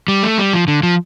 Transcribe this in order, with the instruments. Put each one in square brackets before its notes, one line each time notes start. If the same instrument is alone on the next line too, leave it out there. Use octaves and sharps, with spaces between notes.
[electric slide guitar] G3
A3
G3
F3
D3
F3